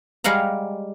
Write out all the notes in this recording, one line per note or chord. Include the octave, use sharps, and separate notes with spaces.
G3 G#3 F5 F#5 A#5